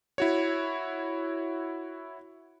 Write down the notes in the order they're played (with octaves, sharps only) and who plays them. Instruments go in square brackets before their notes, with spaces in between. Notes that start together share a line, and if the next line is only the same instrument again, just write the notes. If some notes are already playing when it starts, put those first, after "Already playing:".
[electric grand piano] E4 F#4 C#5